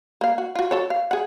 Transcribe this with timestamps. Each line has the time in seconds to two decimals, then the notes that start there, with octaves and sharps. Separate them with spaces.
0.21 A#3 F5
0.38 F#4
0.55 F4 F#4
0.71 F#4 A4 C#5
0.90 F5
1.11 G#4 F#5